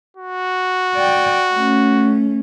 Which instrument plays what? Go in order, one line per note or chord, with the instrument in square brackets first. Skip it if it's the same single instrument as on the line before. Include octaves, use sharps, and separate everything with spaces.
[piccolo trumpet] F#4
[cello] D5 G5
A3 C#4